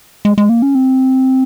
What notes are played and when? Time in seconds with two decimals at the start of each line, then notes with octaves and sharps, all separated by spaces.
0.25 G#3
0.38 G#3
0.49 A#3
0.62 C#4
0.75 C4